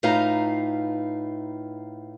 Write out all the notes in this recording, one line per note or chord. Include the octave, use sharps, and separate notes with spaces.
A2 D#4 F4 B4 F5 A#5